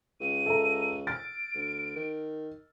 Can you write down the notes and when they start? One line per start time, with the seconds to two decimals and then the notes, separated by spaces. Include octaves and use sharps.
0.20 C#2 D#7
0.46 A4 E5 A#5
1.07 F6 A6 D7
1.55 D2
1.96 D#3